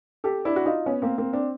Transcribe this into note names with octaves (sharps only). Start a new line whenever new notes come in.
G4 A4
D4 E4
F#4
D#4 F4
B3 C#4
A#3 C4
A#3 C4
C4 D4